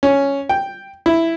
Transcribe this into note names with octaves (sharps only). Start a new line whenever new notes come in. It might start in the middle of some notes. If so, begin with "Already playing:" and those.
C#4
G5
E4